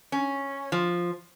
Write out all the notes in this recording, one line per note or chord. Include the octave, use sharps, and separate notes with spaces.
C#4
F3